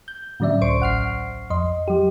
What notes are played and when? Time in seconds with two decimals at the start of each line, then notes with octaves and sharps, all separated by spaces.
0.08 G6
0.40 A2 D3 F#3 C#4 D5 E5
0.61 C#2 C5 C6 C#6 D7
0.80 A1 F#5 F6 C7
1.50 F2 D#5 C6
1.88 F#3 G4